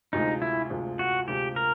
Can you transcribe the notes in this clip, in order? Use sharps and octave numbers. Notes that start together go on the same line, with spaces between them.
D2 C3 F3 G#3 D#4
E4
D2 C3 F3 G#3
F#4
D2 C3 F3 G#3 G4
A#4